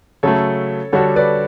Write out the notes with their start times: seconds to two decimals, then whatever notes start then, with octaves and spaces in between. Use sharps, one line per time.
0.23 C#3 F#3 A3 A4 C#5
0.93 D3 G3 D4 F#4 A4 C#5
1.16 B4 D5